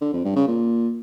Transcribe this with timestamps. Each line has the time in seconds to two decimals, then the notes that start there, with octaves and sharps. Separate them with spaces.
0.01 D3
0.13 F2
0.24 G2
0.36 C#3
0.47 A#2